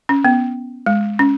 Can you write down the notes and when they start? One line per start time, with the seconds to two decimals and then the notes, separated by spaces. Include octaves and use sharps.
0.09 C#4
0.25 B3
0.86 G#3
1.19 C#4